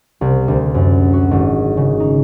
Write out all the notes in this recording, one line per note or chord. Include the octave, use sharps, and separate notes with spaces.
C2
D2
F#2
F#4
G#1
C#3
D#4